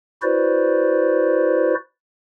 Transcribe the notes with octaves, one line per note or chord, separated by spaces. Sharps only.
E4 F#4 B4 C5 D5